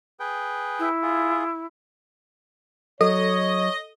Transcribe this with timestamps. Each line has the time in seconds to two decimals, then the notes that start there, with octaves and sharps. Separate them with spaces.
0.20 G#4 B4 G5
0.79 E4
1.02 F4 G#4
3.01 F#3 A4 C#5 D#5